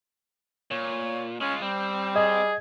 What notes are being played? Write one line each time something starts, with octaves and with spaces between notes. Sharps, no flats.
A#2 C#5
G#3 C#4 F4
G3 C4
G#4 D#5